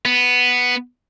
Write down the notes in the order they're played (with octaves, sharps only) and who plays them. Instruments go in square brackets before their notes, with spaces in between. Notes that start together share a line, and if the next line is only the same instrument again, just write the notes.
[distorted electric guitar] B3